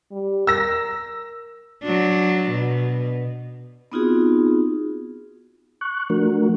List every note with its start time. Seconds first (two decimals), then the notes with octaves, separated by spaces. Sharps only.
0.12 G3
0.47 A#4 E6 A#6
1.82 F#3 D4
2.51 B2
3.92 B3 C4 D#4 F4 F#4 G#4
5.81 C#6 F#6
6.10 F3 A3 D4 F#4 A#4